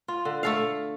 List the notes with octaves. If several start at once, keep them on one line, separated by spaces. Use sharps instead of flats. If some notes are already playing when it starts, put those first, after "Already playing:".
F4
D3
A3 A4 F5